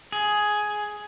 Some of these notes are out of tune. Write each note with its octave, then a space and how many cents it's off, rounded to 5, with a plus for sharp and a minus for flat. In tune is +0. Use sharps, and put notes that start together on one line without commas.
G#4 +10